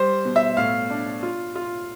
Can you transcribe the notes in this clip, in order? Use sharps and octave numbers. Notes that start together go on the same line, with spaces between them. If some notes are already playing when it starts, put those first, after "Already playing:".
Already playing: G3 C5
B2
E5
A2 F5
D4
F4
F4